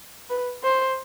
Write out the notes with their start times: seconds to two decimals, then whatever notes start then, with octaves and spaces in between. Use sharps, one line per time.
0.30 B4
0.64 C5